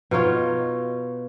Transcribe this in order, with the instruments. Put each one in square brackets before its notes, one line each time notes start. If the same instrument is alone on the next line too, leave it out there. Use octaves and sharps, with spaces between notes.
[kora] B2 D#4 F4 C#5